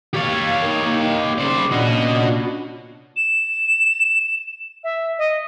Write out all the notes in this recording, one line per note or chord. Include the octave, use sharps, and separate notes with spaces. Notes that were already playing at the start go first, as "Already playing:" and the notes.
G4 C#5 F5 G#6 A6
A#3 D#4
C#3 C5 D5 B5
A#2 C#4 D4 F#4 D#5
E7
E5
D#5